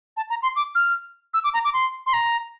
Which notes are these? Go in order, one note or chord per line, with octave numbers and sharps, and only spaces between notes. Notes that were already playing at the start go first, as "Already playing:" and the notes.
A5
A#5
C6
D6
F6
E6
D6
A#5
D6
C6
C6
A#5